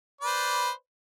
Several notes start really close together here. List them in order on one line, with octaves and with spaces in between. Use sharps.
D5 B4 C5